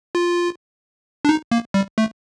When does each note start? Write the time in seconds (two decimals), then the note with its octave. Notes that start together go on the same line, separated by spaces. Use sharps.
0.15 F4
1.25 D4
1.29 D#4
1.52 A#3
1.74 G3
1.98 A3